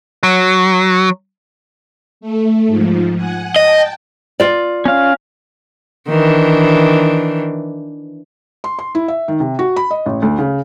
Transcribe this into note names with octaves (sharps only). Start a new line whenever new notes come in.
F#3
A3
G#2 F3
F#5 G#5
D#5 G5 A5
F4 D5
C#4 F5
D#3 E3 D4
C6
C6
E4
E5
D#3
C3
F#4
B5
D#5
A1
D2
C#3